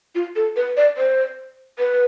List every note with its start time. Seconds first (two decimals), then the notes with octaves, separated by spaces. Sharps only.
0.15 F4
0.36 A4
0.56 B4
0.77 D5
0.97 C5
1.79 B4